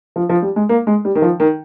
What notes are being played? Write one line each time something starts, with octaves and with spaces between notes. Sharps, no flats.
F3
F3
G3
G#3
A#3
G#3
G3
D#3
F3
D#3